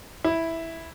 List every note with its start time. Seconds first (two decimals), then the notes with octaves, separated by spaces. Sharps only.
0.24 E4